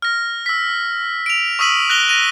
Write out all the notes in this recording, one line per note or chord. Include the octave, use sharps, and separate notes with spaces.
F6 A#6
E6 B6
D7 F7
C#6 D#6 E6 B6 D#7 F#7
F#6 A#6 F7 G7
A#6 D#7 F7